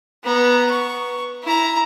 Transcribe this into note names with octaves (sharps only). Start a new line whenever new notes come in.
B3 A#5
C#6
E4 A#5